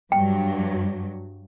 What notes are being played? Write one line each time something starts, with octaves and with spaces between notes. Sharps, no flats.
G2 F#3 G5